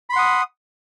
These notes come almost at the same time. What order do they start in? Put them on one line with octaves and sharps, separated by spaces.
B5 C6 F#5 D#6